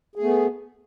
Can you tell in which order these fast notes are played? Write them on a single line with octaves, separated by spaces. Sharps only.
G#4 A3 B3